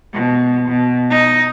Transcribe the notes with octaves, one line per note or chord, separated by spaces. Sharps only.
B2
B2
D#4